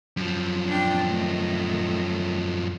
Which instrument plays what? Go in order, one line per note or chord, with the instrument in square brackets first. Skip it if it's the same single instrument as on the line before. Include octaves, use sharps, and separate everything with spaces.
[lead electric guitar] F#2 F3
[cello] D4 G5
D#3 A3